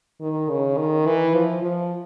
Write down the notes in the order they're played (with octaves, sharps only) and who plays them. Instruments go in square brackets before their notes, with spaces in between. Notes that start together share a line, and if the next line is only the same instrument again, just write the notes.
[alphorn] D#3
C#3
D#3
E3
F3
F3